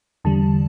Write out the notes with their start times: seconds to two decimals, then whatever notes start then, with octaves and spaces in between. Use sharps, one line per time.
0.24 E2 D3 G3 A5